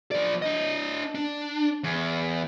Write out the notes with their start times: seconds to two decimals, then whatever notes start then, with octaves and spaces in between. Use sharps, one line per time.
0.11 F3 D5
0.42 D4 D#5
1.15 D4
1.84 E2